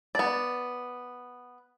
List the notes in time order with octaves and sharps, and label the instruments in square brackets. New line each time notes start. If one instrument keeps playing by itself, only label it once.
[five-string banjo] B3 D5